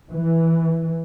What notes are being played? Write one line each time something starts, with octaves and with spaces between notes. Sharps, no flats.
E3